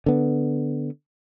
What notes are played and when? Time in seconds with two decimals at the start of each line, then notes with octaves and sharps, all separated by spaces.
0.06 D3 B3